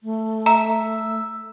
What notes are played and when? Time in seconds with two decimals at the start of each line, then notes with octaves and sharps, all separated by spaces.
0.03 A3
0.46 E5 A#5